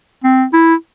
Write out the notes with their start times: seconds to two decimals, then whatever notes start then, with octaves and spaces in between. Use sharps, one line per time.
0.24 C4
0.53 E4